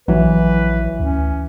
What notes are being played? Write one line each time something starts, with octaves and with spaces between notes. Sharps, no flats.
A#1 E3 F#3 B4
D2 C#4